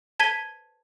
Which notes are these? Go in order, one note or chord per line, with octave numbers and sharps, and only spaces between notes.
A5 G#6 B6 D#7 G7